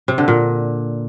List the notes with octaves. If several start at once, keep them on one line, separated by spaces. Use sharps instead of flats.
C3
D3
A#2